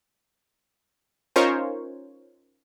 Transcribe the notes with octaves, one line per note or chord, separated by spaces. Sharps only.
C#4 D#4 F4 A#4 C5 C#5